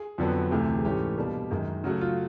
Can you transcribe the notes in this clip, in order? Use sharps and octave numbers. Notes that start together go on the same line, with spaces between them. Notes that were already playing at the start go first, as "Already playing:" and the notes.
Already playing: G#4
F2 D3 F#3 B3
D2 C3 E3 A3 G4
G#4
G#2 E3 A3 C#4 G4
B2 G3 A#3 D4
F#2 D#3 G#3
C#3 F#3 A3 F#4
F4